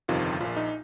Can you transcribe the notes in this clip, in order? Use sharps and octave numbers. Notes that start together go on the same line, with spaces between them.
G1 F2 C3 D#3 F4
A#1 A#2 F4
D#4